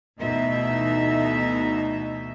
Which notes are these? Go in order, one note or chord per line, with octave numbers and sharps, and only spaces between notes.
D2 B2 E3 D#4 E5